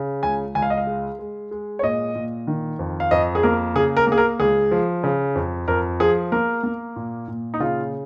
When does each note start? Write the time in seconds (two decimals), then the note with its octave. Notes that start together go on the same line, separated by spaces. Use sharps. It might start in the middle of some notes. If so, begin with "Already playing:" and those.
Already playing: C#3
0.23 C#2 G#5
0.55 C#2 G#5
0.62 F5
0.70 D#5
0.78 F5
0.87 G#3
1.19 G#3
1.51 G#3
1.79 C#5
1.83 A#2 D#5
2.15 A#2
2.47 D#3
2.79 F2
3.00 F5
3.11 F2 D#5
3.35 G#4
3.43 A#3 A#4
3.75 C#3 G#4
3.97 A#4
4.07 A#3 G#4
4.18 A#4
4.39 C#2 G#4
4.71 F3
5.04 C#3
5.35 F2
5.68 F2 A#4
6.00 F3 G#4
6.32 A#3 A#4
6.63 A#3
6.96 A#2
7.28 A#2
7.54 D#4
7.60 C#3 F4